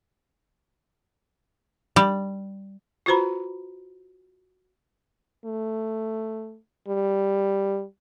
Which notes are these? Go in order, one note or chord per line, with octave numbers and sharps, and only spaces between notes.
G3
F4 F#4 B4 C5 A#5 B5
A3
G3